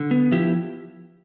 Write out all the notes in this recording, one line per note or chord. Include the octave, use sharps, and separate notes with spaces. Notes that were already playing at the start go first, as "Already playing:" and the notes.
Already playing: D3
B3
F3 E4 G4